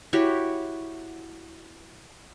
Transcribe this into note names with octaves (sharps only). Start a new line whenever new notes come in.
E4 F#4 G4 C#5